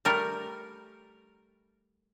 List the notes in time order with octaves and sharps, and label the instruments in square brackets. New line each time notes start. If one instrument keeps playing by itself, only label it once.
[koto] G3 A3 A#4